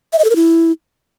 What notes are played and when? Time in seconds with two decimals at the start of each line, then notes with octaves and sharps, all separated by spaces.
0.13 E5
0.19 D#5
0.24 A4
0.30 A#4
0.36 E4